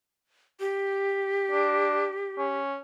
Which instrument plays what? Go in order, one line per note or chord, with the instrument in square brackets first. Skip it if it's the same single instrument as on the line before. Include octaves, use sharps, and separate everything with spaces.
[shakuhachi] G4
[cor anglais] D4
C#4